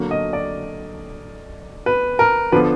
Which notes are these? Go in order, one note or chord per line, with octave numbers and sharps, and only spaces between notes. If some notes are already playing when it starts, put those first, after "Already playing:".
Already playing: D3 F#3 A#3
D#5
D5
B4
A#4
D3 F3 B3 D4 B4